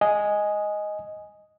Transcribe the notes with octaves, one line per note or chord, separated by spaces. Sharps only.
D#5 G#5